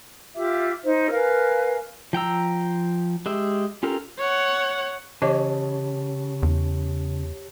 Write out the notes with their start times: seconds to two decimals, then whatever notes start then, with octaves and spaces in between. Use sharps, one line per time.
0.35 F4 G4 E5 D6
0.84 D#4 C5
1.11 A#4 B4 F5 G#5
2.13 F3 G5 A#5 E6
3.26 G#3 G4 E5
3.83 C#4 F4 G4 A4 A#4
4.18 C#5 F#5
5.22 C#3 E3 G4 C#5 D#5 A5 D6
6.43 E2